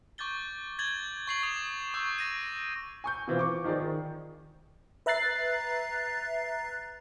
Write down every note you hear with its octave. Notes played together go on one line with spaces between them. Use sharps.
C#6 D6 G6 A6 G7
G#6 A6 F#7 G7
C#6 C7 F#7
D#6 F7
C#6 D6 E6 G6
C#6 A#6 D#7
G#5 C#6 G6
B2 E3 C4 F4
C#6 D6
D#3 F3 D#4 G#4 D5
D#3
B4 E5 A#5 F#6 A6 C7